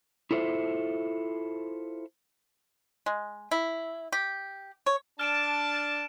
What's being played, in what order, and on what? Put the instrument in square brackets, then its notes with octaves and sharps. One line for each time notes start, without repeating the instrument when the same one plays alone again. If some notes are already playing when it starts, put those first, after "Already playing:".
[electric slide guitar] E4 F4 A4 C5 E5
[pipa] G#3
E4
G4
C#5
[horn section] D4 A5 [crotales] F6 D7 E7